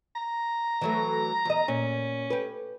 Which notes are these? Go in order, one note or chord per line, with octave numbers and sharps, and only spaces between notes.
A#5
E3 F#3 A3
E2 D#5
A#2 C#4
G4 B4